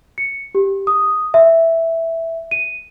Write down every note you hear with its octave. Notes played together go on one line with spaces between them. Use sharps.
C#7
G4
D#6
E5
D#7